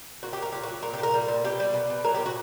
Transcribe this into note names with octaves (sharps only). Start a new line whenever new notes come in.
A#2 F#4
G4
A#2
A#4
A#2 G4
F#4
F#3
A#2 A#4
G4
A#2 A#4
G3
A#2
B2 G4
G3
B2
B2
F#3 A#4
G4
A#2
F#4